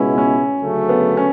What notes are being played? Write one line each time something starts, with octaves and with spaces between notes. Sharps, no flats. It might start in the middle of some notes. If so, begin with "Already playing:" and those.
Already playing: C#2 B2 G#3 B3 C#4 E4
C#4
D2 C#3 F#3 A3
B3
C#4